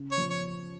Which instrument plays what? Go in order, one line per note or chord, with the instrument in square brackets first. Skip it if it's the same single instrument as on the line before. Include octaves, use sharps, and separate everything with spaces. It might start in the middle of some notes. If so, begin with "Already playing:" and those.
Already playing: [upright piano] C#3
[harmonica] C#5
[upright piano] F3
[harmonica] C#5